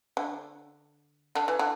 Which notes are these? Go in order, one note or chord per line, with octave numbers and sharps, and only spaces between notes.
D3
D3
E3
D3